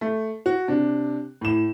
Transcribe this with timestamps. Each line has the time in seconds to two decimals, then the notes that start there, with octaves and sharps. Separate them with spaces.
0.01 A3
0.46 F#4
0.68 C3 D4
1.41 A2 E7